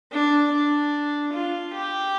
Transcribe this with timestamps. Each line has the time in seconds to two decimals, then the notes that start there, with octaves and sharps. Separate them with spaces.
0.12 D4
0.52 D4
1.33 F4
1.73 G4